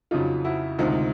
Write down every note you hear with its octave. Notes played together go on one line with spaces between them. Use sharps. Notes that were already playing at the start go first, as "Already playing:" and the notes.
F2 C#3 F#3 D#4 F4
E4 F#4
D2 C3 D#3 G#3 D#4 F4